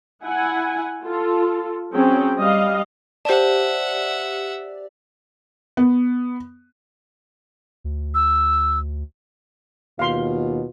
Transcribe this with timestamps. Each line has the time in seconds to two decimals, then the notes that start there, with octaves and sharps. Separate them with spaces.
0.24 E4 F#5 G#5
1.04 F4 A4
1.94 F#3 C4 C#4 G#4 G5
2.36 G3 D#5 F5
3.25 G4 C5 D5 E5 F#5 A5
5.77 B3
7.84 D2
8.15 E6
9.99 D#2 B2 F4 F5 C6